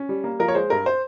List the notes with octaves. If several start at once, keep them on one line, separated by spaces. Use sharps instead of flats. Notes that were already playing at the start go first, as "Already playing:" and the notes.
Already playing: C#4
G3
A#3
F3 A#4
C#5
G#3 C5
G2 A#4
C5